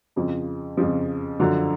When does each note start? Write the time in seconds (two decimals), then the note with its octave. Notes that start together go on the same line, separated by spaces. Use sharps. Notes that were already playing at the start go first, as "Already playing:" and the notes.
0.16 F2 C#3 F3
0.77 F2 C#3 F3
1.40 F#2 D3 F3